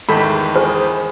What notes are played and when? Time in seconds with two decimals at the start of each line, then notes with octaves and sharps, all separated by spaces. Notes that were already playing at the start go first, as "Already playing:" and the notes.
0.09 E2 G#2 D#3 A4 B5
0.56 G#4 C5